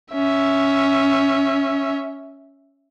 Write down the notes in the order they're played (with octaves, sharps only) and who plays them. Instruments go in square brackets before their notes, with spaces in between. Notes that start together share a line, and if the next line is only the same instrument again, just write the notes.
[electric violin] C#4 E5